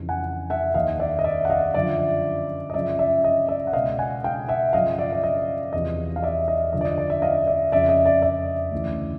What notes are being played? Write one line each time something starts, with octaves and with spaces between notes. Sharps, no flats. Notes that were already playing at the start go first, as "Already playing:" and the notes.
Already playing: F2 C#3 E3
F#5 G#5
E5 F#5
D#2 D#3 D#5 F5
D5 E5
D#5
D5 E5
F#5
D#5 F5
F#2 D3 F3 D5 E5
D#5
F#2 C#3 F3 D5 E5
D5 E5
D#5
D5 E5
F#5
C#2 B2 D#5 F5
F#5 G#5
F5 G5
E5 F#5
F#2 C#3 F3 D#5 F5
D5 E5
D5
D#5
E2 C3 F3 D#5
F5
D5 E5
D#5
F#2 D3 F3 D#5
D5
D#5
D5
D5 E5
D#5 F5
D5 E5
F2 C#3 F3 D5 E5
D#5
D5 E5
D5 E5
D2 C#3 E3